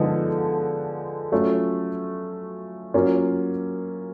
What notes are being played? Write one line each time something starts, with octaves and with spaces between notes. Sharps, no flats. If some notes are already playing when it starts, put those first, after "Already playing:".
Already playing: D3 F3 G#3 B3 D#4
F#3 A3 C#4 F4
F#3 A#3 C#4 F4